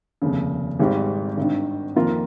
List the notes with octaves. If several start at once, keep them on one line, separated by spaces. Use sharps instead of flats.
F1 D#2 C#3
G#1 G#2 G3
G#1 G2 D#3
F2 D#3 A#3 F4 A#4